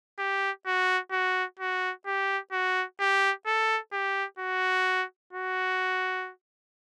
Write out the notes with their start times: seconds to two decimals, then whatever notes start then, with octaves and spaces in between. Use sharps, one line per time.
0.19 G4
0.67 F#4
1.12 F#4
1.60 F#4
2.06 G4
2.52 F#4
3.00 G4
3.47 A4
3.93 G4
4.39 F#4
5.33 F#4